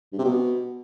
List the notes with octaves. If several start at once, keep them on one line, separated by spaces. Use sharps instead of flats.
G2
C3
B2